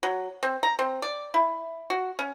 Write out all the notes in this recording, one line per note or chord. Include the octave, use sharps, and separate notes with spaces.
F#3
C4
A#5
C4
D5
E4
F#4
C#4